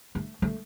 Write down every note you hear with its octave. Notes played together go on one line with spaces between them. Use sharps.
A3
A3